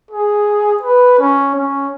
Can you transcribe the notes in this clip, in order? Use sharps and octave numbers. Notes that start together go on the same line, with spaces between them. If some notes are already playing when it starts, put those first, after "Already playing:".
G#4
B4
C#4
C#4